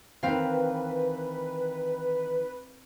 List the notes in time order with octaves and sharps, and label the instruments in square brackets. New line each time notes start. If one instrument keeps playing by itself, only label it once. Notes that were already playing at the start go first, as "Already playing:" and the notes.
[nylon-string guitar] D#3 E3 [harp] C4 F5 [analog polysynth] B4